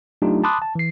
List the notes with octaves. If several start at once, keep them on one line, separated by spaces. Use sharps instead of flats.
F#3 A3 D4 D#4 F4 G4
A5 B5 C6 D6 D#6 F#6
A5
E3 C7